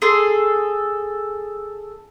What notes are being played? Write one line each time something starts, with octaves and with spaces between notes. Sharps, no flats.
G#4 A4 C6